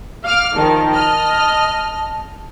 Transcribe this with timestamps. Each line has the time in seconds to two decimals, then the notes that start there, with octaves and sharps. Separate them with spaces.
0.24 F5 D6 F6
0.56 D#3 F3 A5
0.92 D#5 F6